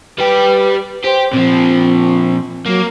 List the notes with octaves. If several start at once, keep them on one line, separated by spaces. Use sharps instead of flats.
G3 G4 B4
G4 C5
A#2 F3 C4
F#3 A#3